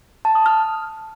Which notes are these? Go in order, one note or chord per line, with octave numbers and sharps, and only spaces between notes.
A5
D#6
F6